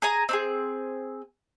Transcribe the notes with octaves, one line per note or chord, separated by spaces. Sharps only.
G#4 G#5 A#5
C4 D4 G#4